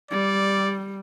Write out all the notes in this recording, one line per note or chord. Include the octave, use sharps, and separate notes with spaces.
G3 D5